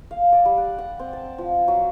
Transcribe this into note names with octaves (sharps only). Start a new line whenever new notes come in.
F5
D5
G3
F#5
F#5
C4
A5
F3
F#3